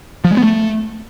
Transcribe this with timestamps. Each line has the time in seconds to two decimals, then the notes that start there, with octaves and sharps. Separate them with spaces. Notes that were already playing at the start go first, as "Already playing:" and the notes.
0.24 F3
0.31 G#3
0.37 B3
0.43 A3